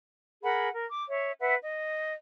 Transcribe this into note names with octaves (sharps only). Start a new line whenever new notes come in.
G#4 A#4 F#5 B5
A#4
D6
C#5 E5
B4 E5 F#5
D#5